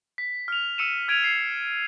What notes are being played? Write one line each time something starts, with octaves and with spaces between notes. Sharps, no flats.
B6
F6 F7
E6 C#7 D#7 E7
F6 G#6 D7 D#7 F7
C7